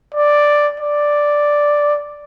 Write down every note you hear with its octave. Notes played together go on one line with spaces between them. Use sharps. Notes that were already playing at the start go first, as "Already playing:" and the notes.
D5
D5